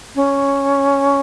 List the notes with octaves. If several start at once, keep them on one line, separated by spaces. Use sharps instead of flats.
C#4